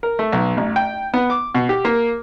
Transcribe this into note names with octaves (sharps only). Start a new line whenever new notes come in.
A#4
A3
B1
A1
G5
B3
D6
B2
G4
A#3